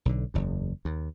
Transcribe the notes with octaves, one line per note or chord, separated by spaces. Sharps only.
B1 D3
F#1 E2
D#2